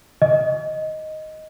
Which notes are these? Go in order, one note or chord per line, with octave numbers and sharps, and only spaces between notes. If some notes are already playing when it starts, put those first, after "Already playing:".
D#5